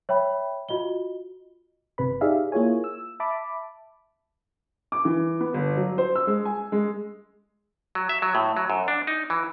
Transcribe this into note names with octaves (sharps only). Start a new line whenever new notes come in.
C#5 E5 G5 B5
F4 F#4 D#5 G7
G1 C3 B4 B5
D#4 G4 G#4 D5 E5 F5
A#3 E4 F4 G#4 C#5 G#5
E6
E5 A5 B5 D6
D6
E3
B3
G1
F#3
C5
E6
G#3
G#5
G#3
F#3
E5
F#3
A2
F#3
F#2
D4
D#4
E3